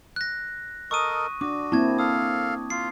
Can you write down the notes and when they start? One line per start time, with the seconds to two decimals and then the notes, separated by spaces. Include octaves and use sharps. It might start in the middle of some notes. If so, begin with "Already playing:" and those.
0.16 F#6 A#6
0.91 A4 A#4 D#5 C#6 D#6 D#7
1.41 D4 F#4 D6
1.72 A#3 C4 E4 A5 G#6
1.98 A4 F5 D#6
2.70 F4 C7